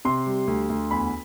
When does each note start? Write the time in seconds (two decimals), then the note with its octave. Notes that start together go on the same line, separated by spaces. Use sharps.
0.05 C3 C6
0.26 G3
0.47 D2
0.70 D2
0.91 E2 B5